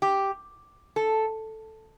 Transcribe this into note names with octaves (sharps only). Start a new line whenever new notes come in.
G4
A4